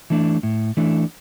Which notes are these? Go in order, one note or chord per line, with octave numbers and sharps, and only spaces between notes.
E3 A3 D4
A2
E3 A3 D4